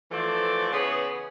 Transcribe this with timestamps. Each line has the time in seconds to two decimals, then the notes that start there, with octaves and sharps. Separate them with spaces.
0.11 E3 F3 A3 A4 C5 D5
0.72 C#3 E3 B3 G#4